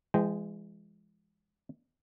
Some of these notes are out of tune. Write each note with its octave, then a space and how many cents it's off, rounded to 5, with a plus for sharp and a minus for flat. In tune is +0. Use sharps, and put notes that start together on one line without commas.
E3 +40 G#3 -10 G5 +0